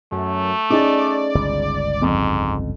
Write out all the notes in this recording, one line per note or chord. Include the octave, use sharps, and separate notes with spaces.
F#2 A3
C#4 D#4 G#4 D5
G1 C#2
F2 G#2